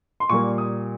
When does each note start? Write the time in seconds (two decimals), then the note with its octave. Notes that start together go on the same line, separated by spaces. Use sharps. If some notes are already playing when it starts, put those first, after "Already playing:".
0.20 C6
0.30 A#2 G3 A#3 C#6
0.58 D#6